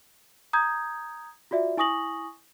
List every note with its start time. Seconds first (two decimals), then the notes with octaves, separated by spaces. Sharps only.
0.53 A#5 D#6 G6 G#6
1.51 F4 F#4 D5 E5
1.77 E4 G#5 C#6 D#6 A#6 F#7